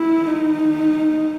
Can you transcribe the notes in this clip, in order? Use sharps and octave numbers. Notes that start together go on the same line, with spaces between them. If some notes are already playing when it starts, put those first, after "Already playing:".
Already playing: E4
D#4